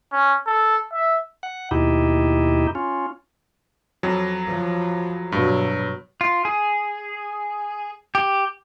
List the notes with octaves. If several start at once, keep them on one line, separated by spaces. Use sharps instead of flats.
C#4
A4
E5
F#5
D#2 B2 D#4 E4 G4
C#4 F4
F2 F#3
F3
G2 B2 F#3
F4
G#4
G4